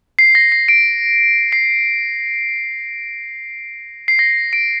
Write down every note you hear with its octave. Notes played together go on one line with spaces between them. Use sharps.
C7
A#6
C7
D7
C7
C7
A#6
D7